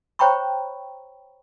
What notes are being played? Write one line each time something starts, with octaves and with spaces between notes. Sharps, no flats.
C5 C#5 G5 A#5 B5 C#6